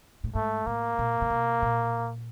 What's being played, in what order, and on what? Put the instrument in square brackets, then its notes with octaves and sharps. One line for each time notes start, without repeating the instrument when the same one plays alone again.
[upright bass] A2
[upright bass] G#2 [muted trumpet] A3
[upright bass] A2 [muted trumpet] A#3
[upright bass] A#2
C3
B2
A#2